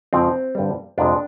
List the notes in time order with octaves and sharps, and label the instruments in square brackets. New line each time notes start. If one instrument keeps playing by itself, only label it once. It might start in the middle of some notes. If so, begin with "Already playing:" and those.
[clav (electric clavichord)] F2 C#3 F3 G#3 C4
G2 D3 G3
F2 C3 F3 G#3 D4